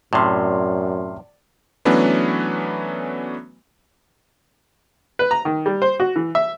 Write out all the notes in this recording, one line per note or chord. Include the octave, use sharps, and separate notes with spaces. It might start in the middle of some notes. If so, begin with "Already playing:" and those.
F#2 A2 C3 D5 E5 C6 F6
E3 F#3 A3 B3 C#4 D4
B4
A#5
D#3
G3
C5
F#4
E3
E5